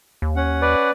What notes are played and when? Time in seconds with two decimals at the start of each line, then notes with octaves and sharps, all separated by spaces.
0.22 D#2
0.36 C#4 F#5
0.62 B4 D5